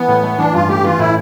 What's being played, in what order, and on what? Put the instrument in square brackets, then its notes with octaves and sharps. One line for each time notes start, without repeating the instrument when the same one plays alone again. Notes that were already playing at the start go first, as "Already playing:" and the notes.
Already playing: [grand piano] E3 [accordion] B3
[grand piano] A2
A3
[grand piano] E3 [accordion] D4
[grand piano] G2 [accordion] F4
[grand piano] A3 [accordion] G4
[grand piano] E3 [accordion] F4
[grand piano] A2 [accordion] E4